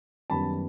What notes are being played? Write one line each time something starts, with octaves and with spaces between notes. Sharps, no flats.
F#2 D#3 G3 B3 A5 B5